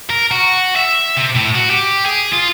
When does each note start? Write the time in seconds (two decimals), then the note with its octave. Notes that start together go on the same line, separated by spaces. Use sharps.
0.10 A#4
0.32 F#4
0.76 E5
1.17 C3
1.35 A2
1.55 F#4
1.70 G4
2.06 G#4
2.33 F4